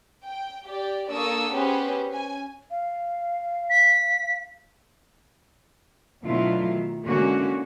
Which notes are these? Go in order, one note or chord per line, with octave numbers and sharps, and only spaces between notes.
G5
G4 D5
A#3 D4 A4 C#6 D#6 E6
B3 C#4 G4 G#4 B4 C5
C#4 G#5
F5
B6
B2 D3 F#3 A3 E4 F4
D#3
D3 E3 G#3 A#3 C#4 F#4